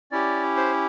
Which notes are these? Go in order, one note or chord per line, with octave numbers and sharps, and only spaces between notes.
C#4 E4 G4 D5
C5